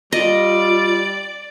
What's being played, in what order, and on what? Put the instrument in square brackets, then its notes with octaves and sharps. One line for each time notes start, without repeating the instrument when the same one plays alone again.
[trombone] G3 [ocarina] F4 [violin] D5 [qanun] D#5